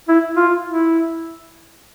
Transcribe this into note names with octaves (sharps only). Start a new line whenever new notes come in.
E4
F4
E4